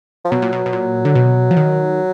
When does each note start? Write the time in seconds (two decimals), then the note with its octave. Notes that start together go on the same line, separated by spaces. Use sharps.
0.25 F3
0.32 B2 F#3
0.42 A#2
0.53 B2
0.66 B2
0.73 A#2
1.05 D3
1.15 B2
1.51 F3
1.57 D#3